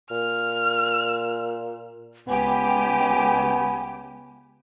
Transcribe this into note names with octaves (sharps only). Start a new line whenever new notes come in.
A#2 F6
C#2 B3 G4 G#5